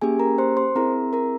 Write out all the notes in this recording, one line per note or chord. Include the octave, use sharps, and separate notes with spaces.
A#3 C#4 G4 G#4 G#5
A#4 A#5
C5 C6
C5 C6
C4 E4 G#4 A#4 A#5
A#4 A#5